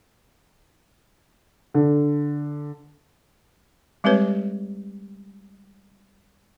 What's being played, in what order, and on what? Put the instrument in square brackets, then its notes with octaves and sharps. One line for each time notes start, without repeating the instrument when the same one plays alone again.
[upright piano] D3
[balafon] G3 G#3 C4 G4 B4 C#5